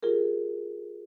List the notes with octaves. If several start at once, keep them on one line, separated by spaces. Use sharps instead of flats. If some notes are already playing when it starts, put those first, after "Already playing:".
F4 G4 G#4 A#4